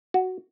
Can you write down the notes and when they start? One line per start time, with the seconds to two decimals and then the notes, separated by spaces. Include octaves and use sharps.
0.14 F#4